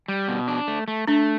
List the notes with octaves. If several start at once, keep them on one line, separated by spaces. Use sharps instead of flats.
G3
B2
D4
A3
A3
A3 D4